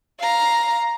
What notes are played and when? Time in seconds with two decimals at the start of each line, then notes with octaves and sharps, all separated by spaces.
0.20 F5 A#5